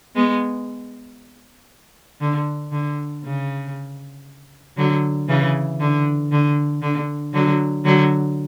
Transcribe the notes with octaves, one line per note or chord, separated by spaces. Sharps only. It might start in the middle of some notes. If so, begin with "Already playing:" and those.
G#3 B3
D3
D3
C#3
D3 F#3
C#3 E3
D3
D3
D3
D3 F#3
D3 F#3